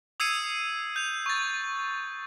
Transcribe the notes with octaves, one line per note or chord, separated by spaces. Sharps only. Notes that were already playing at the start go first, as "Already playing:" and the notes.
D#6 E6 G#6 C7 C#7 D#7
G6 F7
C#6 A6